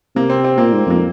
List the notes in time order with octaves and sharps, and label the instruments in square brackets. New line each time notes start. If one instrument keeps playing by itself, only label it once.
[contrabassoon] C3 [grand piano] A#3
[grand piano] C4
C4
[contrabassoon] A#2 [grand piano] A#3
[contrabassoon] G#2
[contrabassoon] F2 [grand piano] A#3